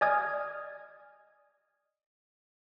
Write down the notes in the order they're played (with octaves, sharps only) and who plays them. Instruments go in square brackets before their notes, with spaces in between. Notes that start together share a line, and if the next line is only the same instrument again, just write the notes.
[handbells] D5 D#5 G#5 D#6 F6 G#6